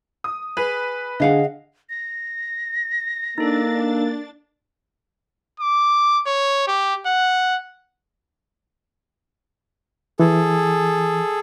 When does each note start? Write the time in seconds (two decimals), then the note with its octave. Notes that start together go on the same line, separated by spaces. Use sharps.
0.24 D#6
0.57 G#4 B4
1.20 D3 G#4 D#5 F5 F#5
1.90 A#6
3.38 A#3 D4 D#4 A4 A6
5.60 D6
6.26 C#5
6.68 G4
7.06 F#5
10.20 E3 G#4 A4